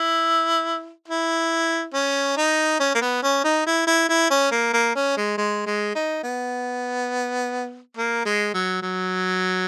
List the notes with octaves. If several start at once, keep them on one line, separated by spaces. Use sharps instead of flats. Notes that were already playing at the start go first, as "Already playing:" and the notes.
Already playing: E4
E4
C#4
D#4
C#4
A#3
B3
C#4
D#4
E4
E4
E4
C#4
A#3
A#3
C#4
G#3
G#3
G#3
D#4
B3
A#3
G#3
F#3
F#3